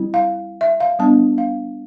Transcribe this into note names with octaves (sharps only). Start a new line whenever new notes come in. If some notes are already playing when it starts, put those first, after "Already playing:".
Already playing: G3 C4 E4
F5
E5
F5
G3 B3 D4 A5
F5